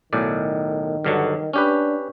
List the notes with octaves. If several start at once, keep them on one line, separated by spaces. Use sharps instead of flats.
B1 A2 D#3 D5
G2 D3 F#3
C#4 D4 G4 B4